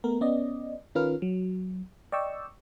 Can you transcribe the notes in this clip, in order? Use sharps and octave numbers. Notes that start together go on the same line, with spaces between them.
A3 B3 A#4
B3 C#4 D5 D#5
D#3 C#4 F4 A#4 B4 F6
F#3
D5 D#5 G5 C#6 E6